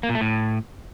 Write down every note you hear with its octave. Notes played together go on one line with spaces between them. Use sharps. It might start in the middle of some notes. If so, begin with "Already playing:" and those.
A#3
A#2
A3
A2